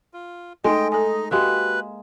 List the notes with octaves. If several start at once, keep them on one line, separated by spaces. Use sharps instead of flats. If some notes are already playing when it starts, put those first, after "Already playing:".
F4
G#3 A3 D#4 D#5 G5 G#5
D#4 A4 D#5 G#5
G#3 A#3 F#4 G4 B4 E5